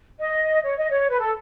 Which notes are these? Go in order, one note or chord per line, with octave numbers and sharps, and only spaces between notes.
D#5
C#5
D#5
C#5
B4
A4